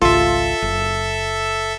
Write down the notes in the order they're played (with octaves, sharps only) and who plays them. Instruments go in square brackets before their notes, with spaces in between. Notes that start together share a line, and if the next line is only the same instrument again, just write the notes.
[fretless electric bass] G#1 C#2 [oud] F4 [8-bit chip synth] A4 E5
[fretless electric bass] F#1